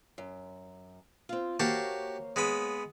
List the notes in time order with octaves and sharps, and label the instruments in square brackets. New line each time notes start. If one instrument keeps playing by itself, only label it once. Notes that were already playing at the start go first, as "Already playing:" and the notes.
[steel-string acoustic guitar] F#2
C4 F4
[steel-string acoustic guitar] A#3 C5 C#5 [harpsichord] F#4 G4 A5
[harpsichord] G#3 B3 B5